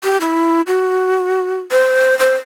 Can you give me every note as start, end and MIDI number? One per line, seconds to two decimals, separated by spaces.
0.04 0.17 67
0.21 0.61 64
0.67 1.61 66
1.72 2.17 72
2.19 2.36 72